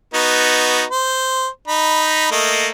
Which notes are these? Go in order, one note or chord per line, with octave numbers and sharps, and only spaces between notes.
B3 D#4 F#4
C5
D#4 B5
A3 A#3 D#5